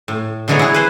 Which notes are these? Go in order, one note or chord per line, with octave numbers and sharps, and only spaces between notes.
A2
D3 E3 F#3 G#3 B3 C#5
E4 G#4
B4 C5